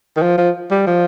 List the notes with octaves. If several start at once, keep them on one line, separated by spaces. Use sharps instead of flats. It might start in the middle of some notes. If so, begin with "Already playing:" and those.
D#3
F3
F3
G3
F3